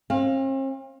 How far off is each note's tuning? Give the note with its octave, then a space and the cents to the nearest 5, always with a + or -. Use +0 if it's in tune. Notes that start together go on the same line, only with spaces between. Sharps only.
C4 +45 F5 +0